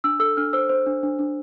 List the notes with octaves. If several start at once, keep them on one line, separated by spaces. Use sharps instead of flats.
D4 E6
A4 E6
D4 F6
C5 E6
C5
D4
D4
D4